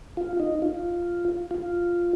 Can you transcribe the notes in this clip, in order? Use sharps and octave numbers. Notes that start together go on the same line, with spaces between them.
F4
D#4
F4
F4